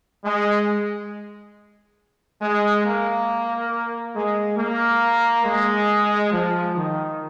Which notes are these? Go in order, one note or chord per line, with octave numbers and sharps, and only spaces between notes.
G#3
G#3
A#3
G#3
A#3
G#3
F3
D#3